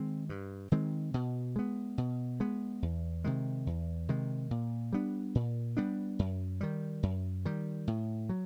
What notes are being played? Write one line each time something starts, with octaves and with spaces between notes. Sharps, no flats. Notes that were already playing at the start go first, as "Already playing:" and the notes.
Already playing: D#3 G#3 C4
G2
D#3 G#3 C4
B2
G#3 B3
B2
G#3 B3
E2
C3 D#3 G#3
E2
C3 D#3 G#3
A#2
G3 B3 D4
A#2
G3 B3 D4
F#2
D#3 G3
F#2
D#3 G3
A2
F#3